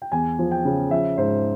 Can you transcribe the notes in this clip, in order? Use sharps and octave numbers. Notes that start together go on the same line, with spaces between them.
G5
E2 G#5
F3
G5
C#3
F3 E5
G#2 C5